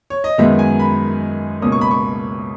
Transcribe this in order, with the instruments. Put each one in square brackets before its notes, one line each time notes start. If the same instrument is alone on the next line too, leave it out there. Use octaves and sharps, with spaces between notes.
[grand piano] C#5
D#5
F#2 D#3 G#3 B3 E5
G#5
B5
C#2 B2 A#3 C#4 D#6
C#6
B5
C#6